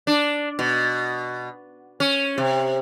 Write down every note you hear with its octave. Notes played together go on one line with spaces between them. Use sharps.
D4
B2
C#4
C3